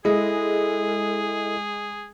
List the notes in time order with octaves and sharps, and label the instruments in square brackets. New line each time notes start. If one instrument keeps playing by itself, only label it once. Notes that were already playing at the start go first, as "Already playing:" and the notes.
[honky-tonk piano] G#3 [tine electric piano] E4 D#5 [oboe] G#4 [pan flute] A4